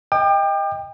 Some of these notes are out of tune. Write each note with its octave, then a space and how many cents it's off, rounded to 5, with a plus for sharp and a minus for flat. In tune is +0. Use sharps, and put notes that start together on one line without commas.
D#5 +15 G5 +20 D6 +45